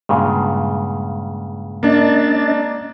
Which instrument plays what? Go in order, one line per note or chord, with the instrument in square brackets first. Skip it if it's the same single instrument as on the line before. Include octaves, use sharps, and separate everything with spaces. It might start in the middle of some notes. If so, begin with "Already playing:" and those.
[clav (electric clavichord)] G2 A#2 C#3 [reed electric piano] G#3 G#4 F#5
[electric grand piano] A#3 D4 [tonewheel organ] C#4 D#5 A6